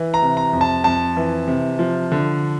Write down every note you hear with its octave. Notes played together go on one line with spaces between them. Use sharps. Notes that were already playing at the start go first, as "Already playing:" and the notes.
Already playing: E3
A#5
C3
A#5
F2
A5
F2 A5
E3
C3
F3
D3